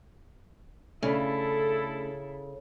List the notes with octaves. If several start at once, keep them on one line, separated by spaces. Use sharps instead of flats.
C#3 A3 C#4 D4 E4 A4